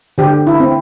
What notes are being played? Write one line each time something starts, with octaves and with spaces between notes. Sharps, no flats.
D3 G4
E4
C4